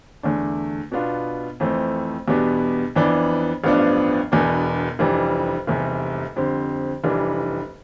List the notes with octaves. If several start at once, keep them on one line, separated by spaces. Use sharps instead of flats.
E2 D3 A3 D4
B2 B3 D4 F4
F2 E3 A3 C4
E2 B2 G3 B3 D4
F2 E3 B3 D4
A1 G2 F3 B3 D4
E1 E2 B2 B3 D4
F1 F2 E3 G3 D4
F1 E2 C3 G3
F2 D3 G3 C4
F1 F2 E3 G3 D4